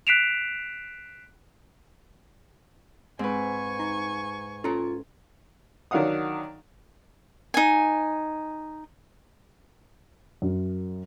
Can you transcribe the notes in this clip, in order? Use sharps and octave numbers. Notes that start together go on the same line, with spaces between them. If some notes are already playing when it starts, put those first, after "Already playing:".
F#6 B6 C7 D7 E7 F7
G#2 C4 B4 G#5 C#6
D#4 A#5
C#4 F4 A4 A#5
D#3 F#3 D4 F5 F#5 D#6
D#4 G#5
F#2